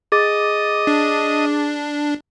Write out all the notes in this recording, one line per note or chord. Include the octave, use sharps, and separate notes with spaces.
G#4 D#5 D6 A6
D4